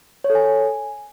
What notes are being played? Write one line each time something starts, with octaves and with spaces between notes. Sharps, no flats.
C#5
A4
G#5